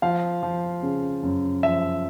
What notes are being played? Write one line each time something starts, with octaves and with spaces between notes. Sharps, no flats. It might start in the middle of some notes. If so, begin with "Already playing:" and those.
F3 F5
F3
C#3
F#2
F3 E5